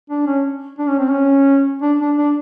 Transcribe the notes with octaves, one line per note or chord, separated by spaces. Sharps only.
D4
C#4
D4
C#4
C4
C#4
D4
D4
D4